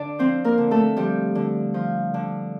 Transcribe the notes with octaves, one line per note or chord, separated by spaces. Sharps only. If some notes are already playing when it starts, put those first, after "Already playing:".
Already playing: D3 D4 D5
F3 C4 C5
A#3 A#4
D3
A3 A4
F3 G3 G4
D3
F3
D3